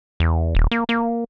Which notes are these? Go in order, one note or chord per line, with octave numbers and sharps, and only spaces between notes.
E2
D#1
A#3
A#3